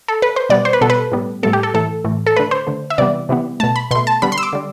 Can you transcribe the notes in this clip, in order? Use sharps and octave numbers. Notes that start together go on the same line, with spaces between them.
A4
B4
C5
B2 G3 B3 D5
C5
B4
B2 G3 B3 A4
B4
A2 G3 B3
A2 G3 B3 A4
G4
A4
A2 E3 A3 A4
A2 E3 A3
A4
D3 A3 B4
C5
D3 A3
E5
C3 E3 G3 B3 D5
C3 E3 G3 B3
B2 A3 A5
B5
B2 A3 C6
A5
D3 G3 B3 B5
C6
E6
D6
D3 G3